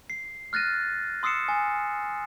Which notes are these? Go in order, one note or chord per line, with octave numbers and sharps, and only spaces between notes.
C7
F6 F#6 A6 A#6 D#7
C6 D#6 E6 C7 C#7 E7
G#5